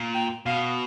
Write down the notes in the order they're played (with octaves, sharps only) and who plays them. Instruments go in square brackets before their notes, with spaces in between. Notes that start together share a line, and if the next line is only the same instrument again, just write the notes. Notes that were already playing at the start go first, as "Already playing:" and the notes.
Already playing: [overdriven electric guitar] A#2
[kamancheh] G5
[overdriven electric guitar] B2 [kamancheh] F5